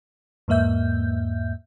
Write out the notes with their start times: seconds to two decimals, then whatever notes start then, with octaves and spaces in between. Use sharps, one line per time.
0.48 E2 G#2 A#3 E5 G6